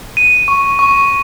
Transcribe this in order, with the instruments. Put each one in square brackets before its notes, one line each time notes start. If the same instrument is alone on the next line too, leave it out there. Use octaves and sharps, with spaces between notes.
[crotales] D#7
C#6
C#6